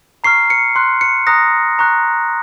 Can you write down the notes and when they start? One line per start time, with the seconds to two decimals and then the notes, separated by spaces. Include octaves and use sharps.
0.24 A#5 C#6 F6 C7
0.50 C#7
0.76 C6 F#6
1.01 C#7
1.27 A#5 D#6 F#6 A#6
1.79 A#5 C#6 F#6